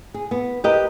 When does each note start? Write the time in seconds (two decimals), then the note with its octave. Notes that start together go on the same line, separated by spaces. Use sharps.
0.14 G#4
0.31 B3
0.64 G4 A#4 B4 D#5